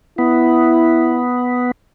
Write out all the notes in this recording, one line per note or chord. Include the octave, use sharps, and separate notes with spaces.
B3 E4